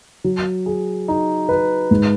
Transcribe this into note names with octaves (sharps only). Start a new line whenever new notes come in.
F#3
G#4
D#4
B4
G#2